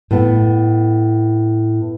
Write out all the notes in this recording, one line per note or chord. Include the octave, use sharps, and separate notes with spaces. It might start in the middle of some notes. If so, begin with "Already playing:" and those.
A2 B3